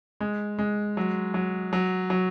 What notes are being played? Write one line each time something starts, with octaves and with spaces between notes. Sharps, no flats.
G#3
G#3
F#3
F#3
F#3
F#3